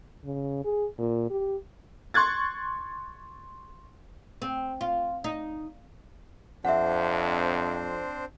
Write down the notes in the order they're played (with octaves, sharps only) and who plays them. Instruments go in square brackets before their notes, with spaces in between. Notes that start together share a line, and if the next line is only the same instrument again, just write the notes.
[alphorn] C#3
G#4
A#2
G4
[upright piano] C6 C#6 F#6 G#6 A6
[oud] C4
F4
D#4
[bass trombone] F2 [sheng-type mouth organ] C4 D4 C5 [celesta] E5 F#5